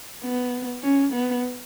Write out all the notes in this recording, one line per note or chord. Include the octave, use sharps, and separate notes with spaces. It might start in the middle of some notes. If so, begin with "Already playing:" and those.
B3
C#4
B3